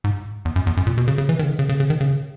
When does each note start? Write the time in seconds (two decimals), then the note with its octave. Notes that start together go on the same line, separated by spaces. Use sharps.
0.04 G#2
0.45 E2
0.56 F#2
0.67 E2
0.77 F#2
0.87 A#2
0.98 B2
1.08 C#3
1.18 C#3
1.29 E3
1.39 D#3
1.44 C#3
1.49 D#3
1.59 C#3
1.69 C#3
1.80 C#3
1.90 D#3
2.01 C#3